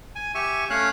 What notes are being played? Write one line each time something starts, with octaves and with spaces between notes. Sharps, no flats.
G#5
G4 E5 G#5 C#6
A3 C#4 C#5 F5 F#6